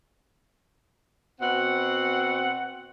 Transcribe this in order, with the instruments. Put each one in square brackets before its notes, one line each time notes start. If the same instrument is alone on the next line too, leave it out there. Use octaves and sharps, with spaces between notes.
[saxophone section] B2 C4 F#5